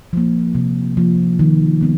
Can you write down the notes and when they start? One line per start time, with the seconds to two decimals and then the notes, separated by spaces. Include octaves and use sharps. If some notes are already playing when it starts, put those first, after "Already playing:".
0.13 F3 A#3
0.55 C3
0.97 F3 A#3
1.39 D#3
1.81 G#3 B3